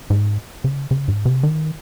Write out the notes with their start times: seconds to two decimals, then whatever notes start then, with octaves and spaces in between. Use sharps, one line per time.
0.10 G#2
0.64 C#3
0.91 C#3
1.08 G#2
1.25 C3
1.43 D#3